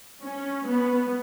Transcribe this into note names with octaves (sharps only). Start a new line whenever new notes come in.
C#4
B3